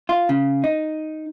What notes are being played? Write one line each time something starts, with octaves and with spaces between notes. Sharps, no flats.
F4
C#3
D#4